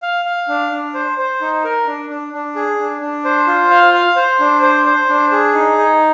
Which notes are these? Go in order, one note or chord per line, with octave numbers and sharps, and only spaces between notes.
F5
F5
D4
D4
C5
C5
D#4
A#4
D4
D4
D4
G#4
D4
D4
C5
F4
F5
F5
C5
D4
C5
C5
D4
G#4
D#4
D#4